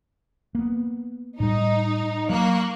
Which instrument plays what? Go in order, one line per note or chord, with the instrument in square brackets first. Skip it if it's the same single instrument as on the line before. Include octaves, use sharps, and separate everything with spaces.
[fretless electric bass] A#3 B3
[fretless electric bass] A2 G3 [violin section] D#4
[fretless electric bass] F#3 [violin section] A#3 C#6 F#6